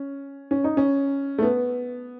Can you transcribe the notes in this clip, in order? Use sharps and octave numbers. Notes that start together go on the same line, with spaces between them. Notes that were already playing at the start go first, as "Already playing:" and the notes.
Already playing: C#4
C#4
D#4
C#4
A3
B3